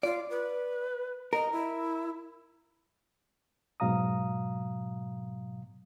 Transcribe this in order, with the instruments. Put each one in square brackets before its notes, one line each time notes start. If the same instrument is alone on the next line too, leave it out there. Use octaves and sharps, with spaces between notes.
[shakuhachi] F4 [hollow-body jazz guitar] D5
[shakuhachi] B4
[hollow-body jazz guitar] A#4 [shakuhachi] D#5
[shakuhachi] E4
[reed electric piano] G#2 B2 F#3 F5 A#5 D#6